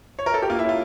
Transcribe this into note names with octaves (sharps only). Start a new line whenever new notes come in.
C#5
A#4
A4
G4
A#3 F4
E4
C#4 F4